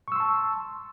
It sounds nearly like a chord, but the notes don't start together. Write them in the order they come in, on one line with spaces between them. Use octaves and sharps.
C#6 E6 C6 A5